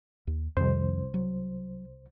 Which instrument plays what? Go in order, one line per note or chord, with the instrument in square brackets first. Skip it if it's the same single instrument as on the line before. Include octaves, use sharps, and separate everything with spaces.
[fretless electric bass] D#2
[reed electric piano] C2 C5 [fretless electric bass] F2 D#3
[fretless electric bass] F#3